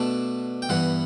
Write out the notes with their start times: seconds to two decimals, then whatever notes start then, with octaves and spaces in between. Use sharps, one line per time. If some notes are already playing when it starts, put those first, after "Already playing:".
Already playing: B2 A3 D4 A5
0.62 G5
0.69 G2 E3 B3 F#5